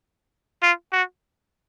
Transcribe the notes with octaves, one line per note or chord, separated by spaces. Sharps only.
F4
F#4